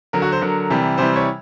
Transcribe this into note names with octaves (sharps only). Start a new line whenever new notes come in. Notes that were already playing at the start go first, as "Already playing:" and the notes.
D3 F#3 A#4
F#4
C5
D3 F#3 A#4
C3 E3 G3
C3 E3 G3 C5
C#5